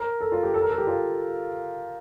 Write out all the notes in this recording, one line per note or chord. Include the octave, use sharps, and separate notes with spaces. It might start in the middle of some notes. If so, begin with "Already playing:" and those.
Already playing: A#4
A4
F4
G4
A4
A#4
A4
G4
F4